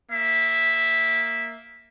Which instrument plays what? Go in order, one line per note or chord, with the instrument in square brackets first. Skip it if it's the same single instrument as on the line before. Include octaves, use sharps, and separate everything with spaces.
[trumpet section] A#3 E5